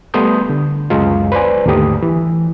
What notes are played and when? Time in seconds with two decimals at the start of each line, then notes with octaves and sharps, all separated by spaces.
0.14 G3 A3 B3 C6 D#6 G6
0.50 D3
0.90 C#2 F#2 G#3 F4
1.32 B4 C5 D5 G#5
1.66 D#2 G#2 D3 A3 G4 D#6
2.03 E3